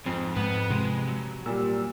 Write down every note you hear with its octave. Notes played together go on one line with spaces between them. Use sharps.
F2 G#2 C4
G#2 B4 F#5
C3 G#3
F#3
A#2 G3 E6